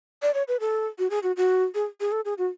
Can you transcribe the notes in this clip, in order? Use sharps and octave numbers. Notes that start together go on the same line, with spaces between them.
D5
C#5
B4
A4
F#4
G#4
F#4
F#4
G#4
G#4
A4
G#4
F#4